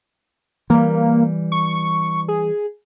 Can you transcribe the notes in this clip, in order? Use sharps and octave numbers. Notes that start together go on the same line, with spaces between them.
E3 G3 A#3
C#6
G#4